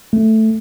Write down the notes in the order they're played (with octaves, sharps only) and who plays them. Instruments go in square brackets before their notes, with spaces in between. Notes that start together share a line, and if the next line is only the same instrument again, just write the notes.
[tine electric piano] A3